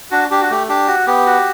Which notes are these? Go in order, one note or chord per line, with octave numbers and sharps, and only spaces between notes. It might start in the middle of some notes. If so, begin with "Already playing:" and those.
D4 F#4
D4 G4
F#4
A3 G4
D4 G4
F#4
B3 G4
F#4